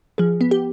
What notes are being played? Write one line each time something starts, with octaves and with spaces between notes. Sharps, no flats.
F3 G#4
B3
G4